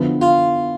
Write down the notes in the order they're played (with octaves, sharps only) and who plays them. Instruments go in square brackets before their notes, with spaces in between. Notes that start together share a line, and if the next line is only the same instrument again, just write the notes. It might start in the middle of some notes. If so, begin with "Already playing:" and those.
Already playing: [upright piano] D3 F3 B3 E4
[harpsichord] F4